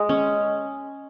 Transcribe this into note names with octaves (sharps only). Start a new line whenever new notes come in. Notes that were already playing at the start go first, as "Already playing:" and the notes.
Already playing: G#3
C#4